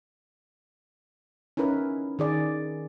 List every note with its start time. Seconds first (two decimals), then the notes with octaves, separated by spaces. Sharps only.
1.57 C#4 D#4 E4 A#4 B4
2.19 D#3 G#4 D5